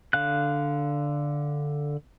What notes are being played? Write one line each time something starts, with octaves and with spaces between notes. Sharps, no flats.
D3 F5 F#6